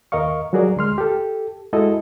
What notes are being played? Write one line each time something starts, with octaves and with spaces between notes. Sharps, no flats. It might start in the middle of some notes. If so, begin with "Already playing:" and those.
D#2 A#4 D#5 F5 C#6
F#3 G3 F#4 G#4 A#4 D5
D2 G#3 C6 F6
G4 A4
G#3 E4 F#4 A4 D#5